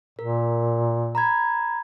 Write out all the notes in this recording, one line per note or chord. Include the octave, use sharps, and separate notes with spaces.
A#2 A#4
A#5 B5 G#6